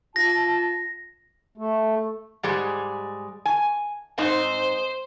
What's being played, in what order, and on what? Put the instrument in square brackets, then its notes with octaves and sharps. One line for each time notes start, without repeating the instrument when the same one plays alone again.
[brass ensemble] F4 A5 [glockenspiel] A#6
[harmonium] A3
[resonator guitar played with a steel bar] G#2 G3 G#3
G#5
[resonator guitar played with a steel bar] G#2 C4 D#4 [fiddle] C5